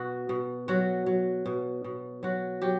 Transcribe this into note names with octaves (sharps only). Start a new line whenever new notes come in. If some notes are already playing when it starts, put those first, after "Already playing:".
Already playing: B2 F#4
B2
F#3 F#4
F#3
B2
B2
F#3 F#4
F#3 G4